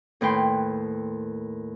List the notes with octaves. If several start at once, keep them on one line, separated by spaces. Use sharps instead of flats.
D#2 A2 B4 G5 C6